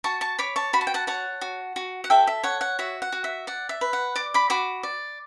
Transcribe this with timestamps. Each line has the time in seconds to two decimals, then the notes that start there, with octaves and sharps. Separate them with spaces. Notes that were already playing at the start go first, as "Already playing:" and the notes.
0.04 F#4 A5 C#6
0.21 A5 C#6
0.39 C#5 B5 D6
0.56 A5 C#6
0.73 F#4 B5
0.81 A5
0.87 G5
0.94 F#5 A5
1.07 C#5 F#5 A5
1.41 F#4
1.76 F#4
2.04 F#5
2.10 A4 E5 G5
2.27 E5
2.44 C#5 F#5
2.61 F#5
2.79 F#4 E5
3.02 F#5
3.12 F#4
3.24 E5
3.47 D5 F#5
3.69 E5
3.81 B4
3.93 F#5
4.16 D5 D6
4.34 B5 D6
4.50 F#4 B5 D6
4.83 D5